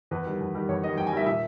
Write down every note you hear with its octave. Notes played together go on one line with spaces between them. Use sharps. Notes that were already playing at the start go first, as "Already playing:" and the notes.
E2 B4
D#3 G3
E2
D#3 G3
E2 C#5
D#3 G3 D#5
E2 G5
G#5
D#3 G3 E5
A#2 E5